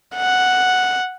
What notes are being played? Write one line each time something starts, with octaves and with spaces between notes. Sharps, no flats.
F#5